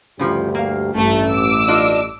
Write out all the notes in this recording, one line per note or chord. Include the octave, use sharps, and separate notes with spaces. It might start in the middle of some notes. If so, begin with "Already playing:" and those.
D2 G2 C#3 F3 G4
A#3 F5
A1 G2 A3
D6 E6
D4 F4 D#5